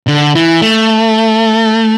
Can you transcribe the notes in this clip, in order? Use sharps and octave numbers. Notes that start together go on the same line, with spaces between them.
D3
E3
A3